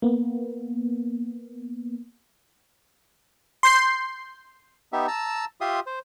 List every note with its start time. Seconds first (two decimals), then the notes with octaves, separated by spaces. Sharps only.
0.02 A#3 B3
3.63 C6 G6 C7
4.93 B3 D#4 G4 E5
5.08 A5 A#5 E6
5.61 F4 G4 E5 C6 D#6
5.87 C5